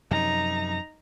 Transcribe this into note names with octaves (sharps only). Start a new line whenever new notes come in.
F#2 C3 F3 D#4 A#5